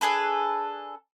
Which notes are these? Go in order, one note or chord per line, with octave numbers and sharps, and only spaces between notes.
D4 G#4 A4 B4